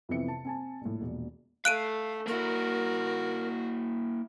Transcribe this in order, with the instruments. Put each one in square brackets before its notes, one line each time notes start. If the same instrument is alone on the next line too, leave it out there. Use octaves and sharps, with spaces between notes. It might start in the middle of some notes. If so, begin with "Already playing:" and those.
[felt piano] F2 C3 E3 B3 E5 C#7
A5
C4 G#5 A5
A#1 A2
E1 A#1
[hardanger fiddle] A3 [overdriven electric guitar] F5 [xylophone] F#6 D7 D#7
[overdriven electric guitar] A#3 E4 [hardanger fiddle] F#4 [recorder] A#4